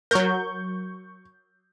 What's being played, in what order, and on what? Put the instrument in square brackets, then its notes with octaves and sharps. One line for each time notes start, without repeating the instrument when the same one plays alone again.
[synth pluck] F#3 A#4 [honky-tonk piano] C#6 G6